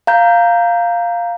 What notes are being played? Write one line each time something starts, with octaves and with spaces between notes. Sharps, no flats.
F5 A#5 G6